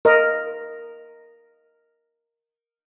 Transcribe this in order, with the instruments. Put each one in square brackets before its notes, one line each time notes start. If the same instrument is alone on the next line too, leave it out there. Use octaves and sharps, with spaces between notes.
[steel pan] A#4 D#5